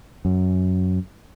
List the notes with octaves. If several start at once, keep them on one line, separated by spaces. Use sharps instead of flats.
F#2